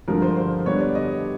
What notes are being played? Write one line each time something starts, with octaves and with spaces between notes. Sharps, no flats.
G2 D3 F3 A#4
C5
C5
D3 G3 B3 D4 C#5
D5
D#5